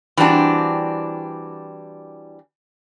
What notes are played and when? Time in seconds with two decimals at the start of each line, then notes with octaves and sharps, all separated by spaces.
0.17 E3 G3 C4 D4 F#4